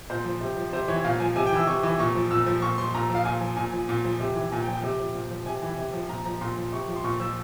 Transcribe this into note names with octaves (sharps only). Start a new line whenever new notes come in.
A#2 C5
F3
C3
F3
C3 C5
E3 C#5
A#2 F5
F3 G#5
C3 G#5
G5
E3 E6
C3 C#6
E3
A#2 C#6
F3
A#2 E6
F3
A#2 C#6
F3 C6
A#2 A#5
F3
F5
A#2 G#5
F3
A#2 G#5
F3
A#2
F3
C3
E3
A#2 G#5
G5
F3
G5
C3
F3
A#2
F3
C3 G#5
E3
C3
F3
A#2 A#5
F3 A#5
A#2 C6
F3
C3 C#6
F3
C6
A#2 C#6
F3 E6